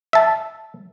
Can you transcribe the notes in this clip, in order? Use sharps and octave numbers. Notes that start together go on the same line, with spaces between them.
E5 A5